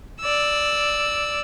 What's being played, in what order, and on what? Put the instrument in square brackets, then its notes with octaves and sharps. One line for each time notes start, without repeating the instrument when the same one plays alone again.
[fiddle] D5 E6